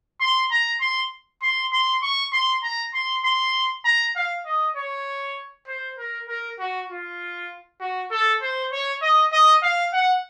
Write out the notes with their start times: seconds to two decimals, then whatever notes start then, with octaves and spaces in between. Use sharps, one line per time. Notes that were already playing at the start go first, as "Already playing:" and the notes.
0.21 C6
0.51 A#5
0.81 C6
1.42 C6
1.73 C6
2.02 C#6
2.33 C6
2.64 A#5
2.94 C6
3.25 C6
3.85 A#5
4.16 F5
4.46 D#5
4.76 C#5
5.67 C5
5.98 A#4
6.28 A#4
6.59 F#4
6.90 F4
7.81 F#4
8.11 A4
8.42 C5
8.72 C#5
9.02 D#5
9.32 D#5
9.63 F5
9.93 F#5